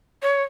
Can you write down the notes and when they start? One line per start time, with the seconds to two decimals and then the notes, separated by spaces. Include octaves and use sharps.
0.22 C#5